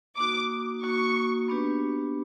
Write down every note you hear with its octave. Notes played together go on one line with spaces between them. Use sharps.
A#3 D#4 F#4 D6
A#3 D#4 F#4 C#6
B3 D4 G4 B4